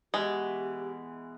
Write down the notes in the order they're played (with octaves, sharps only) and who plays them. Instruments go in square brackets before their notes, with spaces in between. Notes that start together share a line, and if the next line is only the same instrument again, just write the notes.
[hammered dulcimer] B2 E3 [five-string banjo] G#3 [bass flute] G4